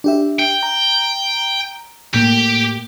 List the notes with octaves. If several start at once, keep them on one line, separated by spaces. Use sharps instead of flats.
D4 G4 E5
G5
A#5
A2 A#3 G4